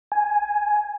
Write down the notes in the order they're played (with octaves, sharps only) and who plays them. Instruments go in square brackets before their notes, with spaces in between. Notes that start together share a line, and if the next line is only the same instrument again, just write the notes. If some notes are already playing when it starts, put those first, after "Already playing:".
[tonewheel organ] G#5